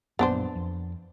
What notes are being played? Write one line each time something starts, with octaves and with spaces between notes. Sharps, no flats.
A#1 F#2 B3 D4 C5
F2